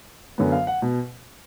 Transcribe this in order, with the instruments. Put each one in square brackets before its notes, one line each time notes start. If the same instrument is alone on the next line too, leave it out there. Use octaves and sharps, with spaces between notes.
[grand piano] F#2 D3 F#3 B3
F5
F#5
B2